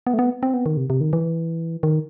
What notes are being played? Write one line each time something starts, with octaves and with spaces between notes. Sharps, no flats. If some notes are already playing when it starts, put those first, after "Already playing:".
B3
A3
B3
C4
B3
D#3
C3
C3
D#3
E3
D#3